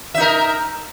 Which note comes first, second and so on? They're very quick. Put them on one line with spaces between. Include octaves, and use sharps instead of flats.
E5 D#4 A#4